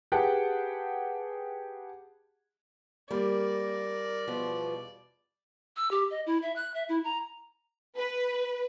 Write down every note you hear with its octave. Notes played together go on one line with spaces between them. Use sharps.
G4 G#4 B4 F#5 G5 A5
G3 A#3 A#4 D5
E2 B2 F3 B3 F4
E6
G4
D#5
E4
E5
F#6
E5
E4
A#5
B4